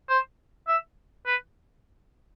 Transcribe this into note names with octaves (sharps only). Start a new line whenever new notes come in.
C5
E5
B4